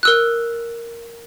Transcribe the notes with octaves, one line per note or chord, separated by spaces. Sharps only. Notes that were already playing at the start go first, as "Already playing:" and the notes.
A#4 E6 F#6